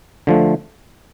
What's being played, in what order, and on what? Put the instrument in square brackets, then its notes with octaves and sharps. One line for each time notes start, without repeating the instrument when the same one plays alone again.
[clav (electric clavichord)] D3 F3 A3